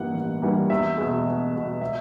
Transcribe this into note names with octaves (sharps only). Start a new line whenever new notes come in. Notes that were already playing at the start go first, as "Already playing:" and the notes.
Already playing: A1 G2 E3 G3 A#3 F#5
A1
G2 E3 G3 A#3
E2 E5
B2 G#3
E2
B2 G#3
E5